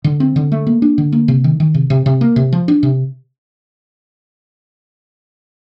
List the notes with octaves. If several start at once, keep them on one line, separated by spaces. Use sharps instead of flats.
D3
C4
D3
A3
A#3
D4
D3
A#3
C3
D#3
D#3
C3
C3
C3
A#3
C3
F3
D4
C3